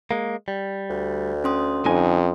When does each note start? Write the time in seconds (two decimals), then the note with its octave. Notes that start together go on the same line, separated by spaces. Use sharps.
0.11 G#3 A#3
0.48 G3
0.90 D2
1.44 C#4 C6 D#6
1.86 F2 D3 D#4 G#5